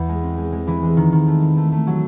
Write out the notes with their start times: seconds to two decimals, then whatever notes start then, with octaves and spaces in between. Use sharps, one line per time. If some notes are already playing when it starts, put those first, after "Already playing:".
Already playing: E2
0.09 G#3
0.23 C4
0.38 G#3
0.53 G#3
0.67 E3
0.83 G#3
0.97 D#3
1.12 D#3
1.27 A3
1.42 E3
1.57 A3
1.72 A3
1.87 F#3